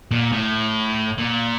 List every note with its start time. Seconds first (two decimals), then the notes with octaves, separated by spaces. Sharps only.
0.11 A#2
0.32 A2
1.18 A#2